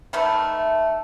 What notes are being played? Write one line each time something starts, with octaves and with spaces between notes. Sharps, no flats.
D#3 A3 A4 B4